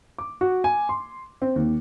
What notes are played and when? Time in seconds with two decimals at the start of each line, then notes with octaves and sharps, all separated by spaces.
0.18 D6
0.41 F#4
0.64 G#5
0.89 C6
1.42 C4
1.56 D#2